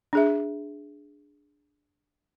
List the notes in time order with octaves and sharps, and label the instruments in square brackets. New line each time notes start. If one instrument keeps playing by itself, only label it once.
[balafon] D4 G#4 E5